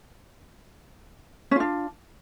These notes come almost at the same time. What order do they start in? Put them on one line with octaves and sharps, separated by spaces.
C#4 F4 D4